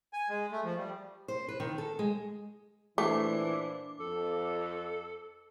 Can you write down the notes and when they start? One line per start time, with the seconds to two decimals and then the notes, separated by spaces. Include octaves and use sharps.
0.13 G#5
0.29 G#3
0.52 A3
0.64 F3
0.77 G3
1.28 C5
1.48 B4
1.60 D#3
1.78 A4
1.99 G#3
2.98 A#2 E3 A3 D4 C5 D6
4.00 F2 A4